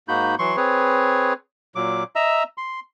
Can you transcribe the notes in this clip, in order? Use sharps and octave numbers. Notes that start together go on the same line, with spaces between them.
G#2 A#3 D#4 F#4 B5 G6
E3 F#3 C6 C#6
C4 G#4 B4 C#5
A#2 F#3 D6
D#5 E5 A#5 E6
C6